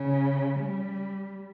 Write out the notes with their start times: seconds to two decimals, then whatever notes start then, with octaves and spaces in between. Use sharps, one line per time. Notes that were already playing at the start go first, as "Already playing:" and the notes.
Already playing: C#3
0.59 G3